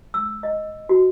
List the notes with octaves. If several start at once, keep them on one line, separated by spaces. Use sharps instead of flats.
E6
D#5
F#4